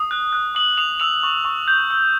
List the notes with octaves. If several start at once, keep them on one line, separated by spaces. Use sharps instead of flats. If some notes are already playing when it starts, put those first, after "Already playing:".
Already playing: D#6
F#6
F#6
D#6 F#7
D#6 F7
E6 F7
C#6
C#6
G6
E6